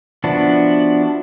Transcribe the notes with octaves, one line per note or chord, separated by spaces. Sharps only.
F3 B3 D4 E4 F#4